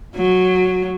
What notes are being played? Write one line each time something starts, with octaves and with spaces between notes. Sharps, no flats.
F#3